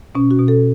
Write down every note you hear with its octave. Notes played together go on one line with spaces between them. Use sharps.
B2 C#4
F#4
B2
A4